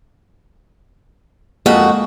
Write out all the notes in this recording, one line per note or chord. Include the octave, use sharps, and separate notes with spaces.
F2 G#3 A#3 F#4 G#4